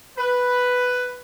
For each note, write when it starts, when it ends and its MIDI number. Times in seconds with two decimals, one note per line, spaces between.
0.18 1.21 71